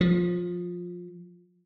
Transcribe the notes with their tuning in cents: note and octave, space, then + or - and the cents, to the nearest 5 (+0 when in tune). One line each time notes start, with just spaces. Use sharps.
F3 +15